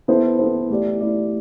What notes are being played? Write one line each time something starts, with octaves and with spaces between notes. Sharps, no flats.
B3 E4 A4 C5
B3 E4 A4 C5
A3 E4 G4 D5
A3 E4 G4 D5